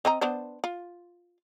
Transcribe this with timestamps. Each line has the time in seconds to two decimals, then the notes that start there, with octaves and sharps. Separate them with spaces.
0.05 C4 D#5 A#5
0.21 B3 D4 C5
0.64 F4